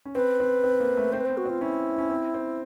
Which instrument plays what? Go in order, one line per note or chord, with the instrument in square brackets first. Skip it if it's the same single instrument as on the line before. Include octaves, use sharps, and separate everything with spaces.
[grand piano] C#4
[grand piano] C4 [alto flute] B4
[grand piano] C4
C4
A#3
A3
[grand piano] C4 [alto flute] C5
[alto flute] B4
[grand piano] B3 [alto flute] C5
[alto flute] F#4
[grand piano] C4 [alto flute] F4
[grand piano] C#4 [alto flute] E4
[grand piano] C#4
C4
C4